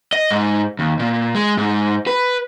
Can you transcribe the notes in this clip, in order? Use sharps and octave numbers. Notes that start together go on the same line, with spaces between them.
D#5
G#2
D#2
A#2
G#3
G#2
B4